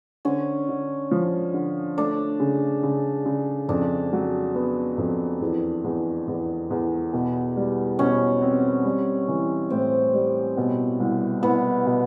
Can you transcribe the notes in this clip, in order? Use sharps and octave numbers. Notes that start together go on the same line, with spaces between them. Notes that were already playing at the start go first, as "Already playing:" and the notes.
D3 C#4
D3
F3
D3
A3 D4
C#3
C#3
C#3
F2 D4
F#3
B3
F2
E2
E2
E2
E2
B2
G3
B2 C#4
C4
G3
E3
A2 C4
G3
B2
C2
C2 B3
B2